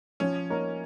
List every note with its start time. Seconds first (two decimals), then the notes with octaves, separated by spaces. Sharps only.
0.20 F3 C#4
0.50 A#3 D#4 A#4 C#5